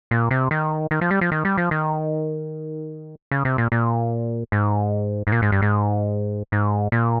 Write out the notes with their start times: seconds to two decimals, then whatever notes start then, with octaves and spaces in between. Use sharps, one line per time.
0.11 A#2
0.31 C3
0.51 D#3
0.91 D#3
1.01 F3
1.11 G3
1.21 F3
1.32 D#3
1.45 G3
1.58 F3
1.71 D#3
3.31 C#3
3.45 C3
3.58 A#2
3.72 A#2
4.52 G#2
5.27 G#2
5.32 A#2
5.42 G#2
5.52 G2
5.62 G#2
6.52 G#2
6.92 A#2